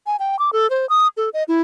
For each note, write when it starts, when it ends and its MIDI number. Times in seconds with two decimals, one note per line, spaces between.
0.07 0.16 80
0.19 0.39 79
0.39 0.50 86
0.53 0.69 69
0.70 0.88 72
0.89 1.08 87
1.17 1.29 69
1.34 1.43 75
1.48 1.62 64